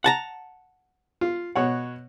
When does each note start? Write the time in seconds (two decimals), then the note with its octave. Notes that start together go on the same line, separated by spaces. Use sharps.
0.04 F#5 A5 A#5
1.21 F4
1.55 B2 C#5 F#5